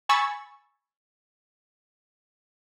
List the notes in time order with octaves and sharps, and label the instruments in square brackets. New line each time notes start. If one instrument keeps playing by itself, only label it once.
[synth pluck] G#5 B5 C#6 E6 G#6 A6